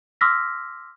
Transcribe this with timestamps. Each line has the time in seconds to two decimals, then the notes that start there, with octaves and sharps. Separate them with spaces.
0.21 C6 D6 E6 F6 A#6 B6